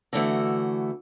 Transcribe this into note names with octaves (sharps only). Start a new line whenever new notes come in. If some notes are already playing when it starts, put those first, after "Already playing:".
D3 E3 A3 F#4